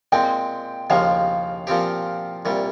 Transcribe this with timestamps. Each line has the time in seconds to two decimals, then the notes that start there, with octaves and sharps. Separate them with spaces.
0.12 A#2 G#3 C4 G5
0.90 D#2 C#3 F3 G#3 F5
1.67 A#2 F3 C4 G4
2.45 C2 A#2 G3